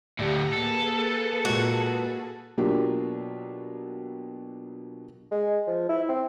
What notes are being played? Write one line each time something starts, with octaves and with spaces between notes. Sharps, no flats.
D2 A2 G4 D5 E5 F#5 A#5
A#3 G#4 A4 B4
A#2 G#3 F#4
B2 F#3 A#3 D4 F4 G4
G#3
F3
E4
C4